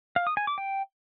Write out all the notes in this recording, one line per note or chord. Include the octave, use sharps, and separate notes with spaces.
F5
D#6
G#5
D6
G5